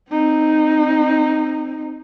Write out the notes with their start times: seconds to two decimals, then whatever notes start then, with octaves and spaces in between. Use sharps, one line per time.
0.10 C4 D#4